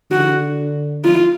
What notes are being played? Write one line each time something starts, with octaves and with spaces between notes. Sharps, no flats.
D3 F#4
F4